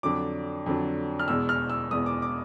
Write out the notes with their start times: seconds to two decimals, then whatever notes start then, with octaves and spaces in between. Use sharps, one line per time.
0.03 F2 D3 F#3 D6
0.66 F2 D3 F#3
1.19 F6
1.28 E2 B2 G#3 E6
1.49 F6
1.70 E6
1.91 E2 B2 G#3 D#6
2.06 D6
2.22 D6